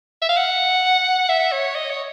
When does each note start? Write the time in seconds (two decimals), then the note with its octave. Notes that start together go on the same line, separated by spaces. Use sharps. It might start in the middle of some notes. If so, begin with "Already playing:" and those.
0.22 E5
0.29 F5
0.37 F#5
1.29 E5
1.52 C#5
1.75 D#5
1.90 C#5